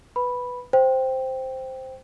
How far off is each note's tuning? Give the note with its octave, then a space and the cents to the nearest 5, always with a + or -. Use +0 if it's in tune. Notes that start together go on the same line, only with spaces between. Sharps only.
B4 +0 B5 -5
C5 +0 G5 +0